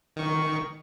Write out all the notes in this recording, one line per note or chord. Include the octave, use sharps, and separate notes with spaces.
D#3 C#6